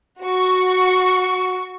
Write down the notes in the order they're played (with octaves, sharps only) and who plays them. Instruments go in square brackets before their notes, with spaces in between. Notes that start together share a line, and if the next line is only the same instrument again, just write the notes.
[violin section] F#4 C#6